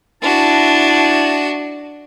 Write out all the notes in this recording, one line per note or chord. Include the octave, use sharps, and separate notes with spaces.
D4 E4 F#4 A5